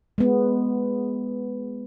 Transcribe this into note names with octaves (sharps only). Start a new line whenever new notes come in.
G#3 B3